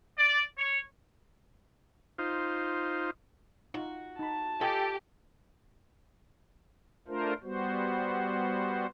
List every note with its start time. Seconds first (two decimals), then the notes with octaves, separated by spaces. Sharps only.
0.18 D5
0.58 C#5
2.18 D#4 F4 C5
3.74 D#4 F4 F#4
4.19 D#4 A5 B5
4.61 F4 G4 A4 D#5 G#5
7.08 A3 D4 F4 A#4 C5
7.43 G3 B3 F#4 C5